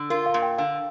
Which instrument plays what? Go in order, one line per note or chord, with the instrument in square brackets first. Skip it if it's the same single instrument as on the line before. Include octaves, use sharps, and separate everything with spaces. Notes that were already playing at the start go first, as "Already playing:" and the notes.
Already playing: [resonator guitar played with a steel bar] D3
[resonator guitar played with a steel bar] F4 [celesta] A#4
[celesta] F5
[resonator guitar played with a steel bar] A#2
[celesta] G5
[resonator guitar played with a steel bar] D3 [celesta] F5